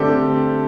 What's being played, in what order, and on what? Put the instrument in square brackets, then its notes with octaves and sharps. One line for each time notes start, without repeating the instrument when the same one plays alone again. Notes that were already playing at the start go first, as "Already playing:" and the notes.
Already playing: [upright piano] D3 A3 C4 G4 [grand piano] A4 C5 D5